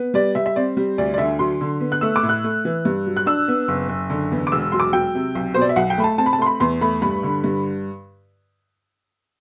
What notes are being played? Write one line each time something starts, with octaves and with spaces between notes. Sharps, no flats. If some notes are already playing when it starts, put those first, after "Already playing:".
Already playing: B3
G3 D5
G3 E5
E5
C4 D5
G3
D2 D5
D5
D3 E5
F#3 C6
D3
B3
F#6
A3 E6
D6
A2
F#6
A3
E3
G2
F#3
F#6
D4 E6
B3
F#1
F#1
D3
E2
D6
E1 E6
F#3 C6
D6
F#3 G5
C3
B1
B2 C5
D5
E5
B1 F#5
G5
A3 B5
A5
C4 A5
B5
A5
A3 C6
B5
E2 C6
A3 B5
G2 B5
D3
G2